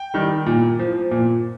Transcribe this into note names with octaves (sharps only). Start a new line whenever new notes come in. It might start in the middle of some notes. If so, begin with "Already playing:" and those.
Already playing: G5
D#3 G3
A#2
F3
A#2